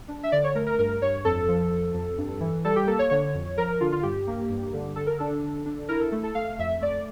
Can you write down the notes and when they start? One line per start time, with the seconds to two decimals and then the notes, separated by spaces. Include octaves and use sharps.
0.08 D4
0.23 E5
0.32 D3 D5
0.44 C#5
0.55 A3 A#4
0.67 A#4
0.78 G2 A#4
1.02 G2 C#5
1.25 F2 A4
1.48 F3
1.72 F2
1.94 F2
2.18 G2
2.40 E3
2.64 G3 A4
2.76 G4
2.87 A#3 A4
2.99 C#5
3.10 D3 C#5
3.34 F2
3.57 F3 A#4
3.80 D3 F4
3.92 F4
4.03 G2 G4
4.27 A#3
4.50 G2
4.73 D3
4.96 D3 A4
5.07 A#4
5.18 D4 A4
5.43 D3
5.66 D4
5.89 E4 A#4
6.00 A4
6.12 A3 A4
6.23 A4
6.35 A3 F5
6.59 F2 E5
6.81 A3 D5